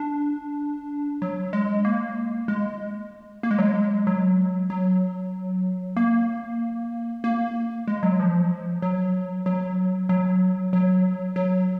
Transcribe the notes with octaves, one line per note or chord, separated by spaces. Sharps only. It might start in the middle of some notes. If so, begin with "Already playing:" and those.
Already playing: D4
F#3
G#3
A#3
G#3
A#3
G#3
F#3
G#3
F#3
F#3
A#3
A#3
G#3
F#3
F3
F#3
F#3
F#3
F#3
F#3